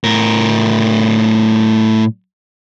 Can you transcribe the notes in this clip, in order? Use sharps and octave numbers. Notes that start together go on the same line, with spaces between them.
A2 A#4